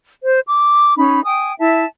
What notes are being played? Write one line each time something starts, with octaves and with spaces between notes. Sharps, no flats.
C5
D6
C#4 D#4 B5
G5 G#5 D#6
E4 E5 A5